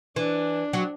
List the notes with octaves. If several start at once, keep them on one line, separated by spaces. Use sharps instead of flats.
E3 D4
F#3